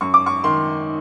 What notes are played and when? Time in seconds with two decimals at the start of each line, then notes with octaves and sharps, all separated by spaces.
0.01 F#2 C#6
0.14 D6
0.26 C#6
0.44 D#3 C6